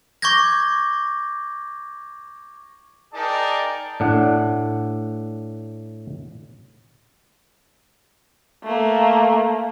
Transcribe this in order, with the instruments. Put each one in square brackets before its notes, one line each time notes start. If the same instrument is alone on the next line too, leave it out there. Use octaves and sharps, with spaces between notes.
[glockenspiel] C#6 D6 G6 G#6 A#6
[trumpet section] D#4 G#4 A#4 D5 G5 A5
[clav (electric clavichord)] A2 D4 F#5
[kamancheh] A3 A#3